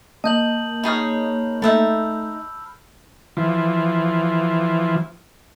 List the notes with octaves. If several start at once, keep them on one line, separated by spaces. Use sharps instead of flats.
A#3 D#5 A5 G6 F#7
D#4 G#4 C#5 B5 F6
A3 D#4 E5 A5 B5 E6
E3 F3